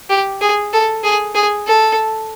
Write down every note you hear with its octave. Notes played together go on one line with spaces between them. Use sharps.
G4
G#4
A4
G#4
G#4
A4